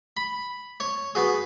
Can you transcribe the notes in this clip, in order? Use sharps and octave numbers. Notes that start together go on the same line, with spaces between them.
B5
C#5 C#6
B3 F#4 G#4